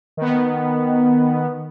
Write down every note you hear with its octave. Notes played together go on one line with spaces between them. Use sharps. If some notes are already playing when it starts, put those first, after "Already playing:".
D#3 B3